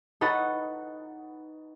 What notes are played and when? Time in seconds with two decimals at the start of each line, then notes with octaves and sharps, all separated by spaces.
0.21 D#4 A4 B4 C#5 F#5 A6